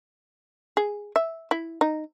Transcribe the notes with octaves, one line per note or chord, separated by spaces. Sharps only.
G#4
E5
E4
D#4